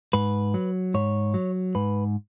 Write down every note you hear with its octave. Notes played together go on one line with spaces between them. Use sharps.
G#2 B4
F#3
G#2 C#5
F#3
G#2 B4